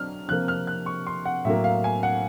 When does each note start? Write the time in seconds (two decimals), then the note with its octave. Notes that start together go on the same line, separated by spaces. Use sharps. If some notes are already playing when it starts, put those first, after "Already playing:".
Already playing: F#3 D4 F6
0.28 C3 F3 A#3 F#6
0.48 F6
0.67 F#6
0.86 C#6
1.07 C6
1.25 F#5
1.45 A2 F#3 A#3 E5
1.64 F5
1.84 G#5
2.03 F#5